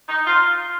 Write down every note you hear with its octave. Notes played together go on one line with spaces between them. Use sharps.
D#4
F4